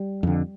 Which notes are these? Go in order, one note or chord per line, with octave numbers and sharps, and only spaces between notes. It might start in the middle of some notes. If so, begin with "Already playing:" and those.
Already playing: G3
F2 D3